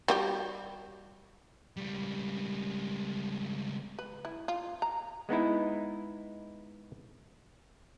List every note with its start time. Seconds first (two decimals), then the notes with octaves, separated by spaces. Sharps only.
0.08 G3 F#4 G4
1.78 C#2 G3
3.99 B4
4.25 E4
4.48 F4
4.82 A#5
5.29 G#3 B3 D#4 E4